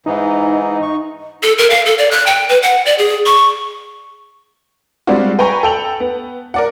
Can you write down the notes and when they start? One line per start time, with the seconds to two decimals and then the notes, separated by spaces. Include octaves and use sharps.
0.06 G#2 E3 D#4
0.82 C#6
1.43 A4
1.58 A#4
1.70 F5
1.86 A4
1.98 D5
2.11 F#6
2.26 G5
2.49 B4
2.63 F#5
2.86 D5
2.98 G#4
3.26 C#6
5.07 G3 G#3 C4 D4 F4 F#4
5.39 B4 G5 G#5 A#5 C#6
5.63 A4 G5 F7 F#7
6.00 B3
6.54 A#4 D5 F#5